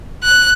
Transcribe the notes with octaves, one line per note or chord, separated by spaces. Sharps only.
F#6